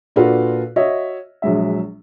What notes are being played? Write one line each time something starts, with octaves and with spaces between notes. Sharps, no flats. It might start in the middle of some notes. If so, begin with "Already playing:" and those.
A#2 D4 F4 F#4 A4 B4
F#4 C#5 D#5 E5
A#1 F#3 G#3 E5